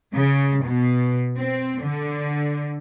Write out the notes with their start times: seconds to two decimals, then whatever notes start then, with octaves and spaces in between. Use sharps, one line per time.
0.14 C#3
0.64 B2
1.38 C4
1.83 D3